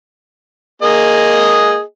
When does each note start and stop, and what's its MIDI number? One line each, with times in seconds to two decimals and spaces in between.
0.82 1.81 58
0.82 1.81 68
0.82 1.81 75